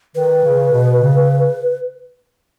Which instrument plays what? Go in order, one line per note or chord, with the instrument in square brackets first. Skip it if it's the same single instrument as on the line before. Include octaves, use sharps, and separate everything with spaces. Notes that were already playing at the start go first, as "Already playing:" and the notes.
[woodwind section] D#3 [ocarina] B4
[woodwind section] C#3
B2
C#3